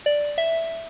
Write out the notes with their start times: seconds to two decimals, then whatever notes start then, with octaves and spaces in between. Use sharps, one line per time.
0.06 D5
0.38 E5